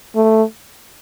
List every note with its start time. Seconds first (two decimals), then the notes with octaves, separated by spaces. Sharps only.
0.16 A3